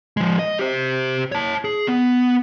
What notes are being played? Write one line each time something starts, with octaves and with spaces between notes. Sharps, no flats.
F3 G#3
D#5
G4 C5
C#5 A5
G#4
B3